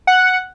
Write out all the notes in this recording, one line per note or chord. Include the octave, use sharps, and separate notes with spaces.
F#5